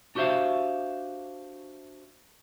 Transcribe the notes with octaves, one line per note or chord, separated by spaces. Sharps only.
D4 F#4 G4 C5 E5 F5